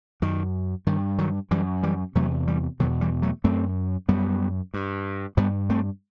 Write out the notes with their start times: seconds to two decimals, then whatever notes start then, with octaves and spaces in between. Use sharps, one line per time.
0.22 F#2 D#3
0.87 G2 D#3
1.18 D#3 F#3
1.51 F#2 E3 G3
1.83 E3 G3
2.15 E2 C3 F#3 A3
2.47 E3 G3
2.80 B2 D#3 F#3
2.83 E2
3.01 E3 G3
3.22 F#3 A3
3.44 F#2 A3 C4
4.08 F#2 G3 B3
4.74 G2
5.37 G2 G3 B3
5.70 A3 C4